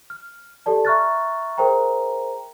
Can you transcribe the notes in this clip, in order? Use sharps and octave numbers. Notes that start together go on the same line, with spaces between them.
F6
G4 A4 D5 A5
E5 A#5 C#6 F6 F#6 A6
G#4 A#4 C5 E5 G5 A#5